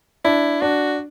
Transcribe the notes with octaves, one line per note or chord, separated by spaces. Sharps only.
D4 E4
D4 F#4